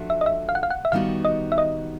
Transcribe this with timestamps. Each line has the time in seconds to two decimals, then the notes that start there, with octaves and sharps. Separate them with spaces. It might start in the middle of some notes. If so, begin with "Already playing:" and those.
Already playing: F3 A3 D4 F#4
0.10 E5
0.21 D#5
0.26 E5
0.49 F5
0.55 F#5
0.63 F5
0.70 F#5
0.85 E5
0.92 D#3 G3 B3 D#4 F#4 F5
1.25 D#5
1.52 E5
1.58 D#5